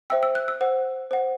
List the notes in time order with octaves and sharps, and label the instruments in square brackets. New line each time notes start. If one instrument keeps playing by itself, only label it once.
[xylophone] C5 E5 G5 E6
E6
F#6
E6
C5 F#5
C5 F#5